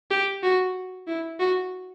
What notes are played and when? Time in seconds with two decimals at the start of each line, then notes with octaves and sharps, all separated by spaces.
0.11 G4
0.43 F#4
1.07 E4
1.39 F#4